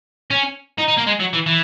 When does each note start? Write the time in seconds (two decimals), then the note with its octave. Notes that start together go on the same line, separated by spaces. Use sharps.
0.31 C#4
0.78 D#4
0.88 D#4
0.98 A#3
1.07 G#3
1.20 F#3
1.33 E3
1.46 E3